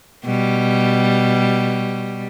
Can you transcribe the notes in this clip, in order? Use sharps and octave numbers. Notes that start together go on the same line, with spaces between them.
B2 G3